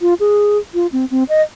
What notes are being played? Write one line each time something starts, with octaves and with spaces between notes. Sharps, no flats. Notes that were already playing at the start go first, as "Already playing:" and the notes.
F4
G#4
F4
C4
C4
D#5